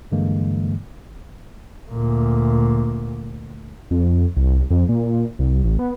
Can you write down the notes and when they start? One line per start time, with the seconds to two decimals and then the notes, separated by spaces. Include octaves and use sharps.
0.12 G2 D3 E3 G#3 A#3
1.91 D2 A#2
3.91 F2
4.37 C2
4.71 F2
4.89 A#2
5.39 C2
5.64 A1
5.79 B3